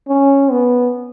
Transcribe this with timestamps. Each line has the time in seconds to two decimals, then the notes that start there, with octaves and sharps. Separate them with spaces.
0.08 C#4
0.51 B3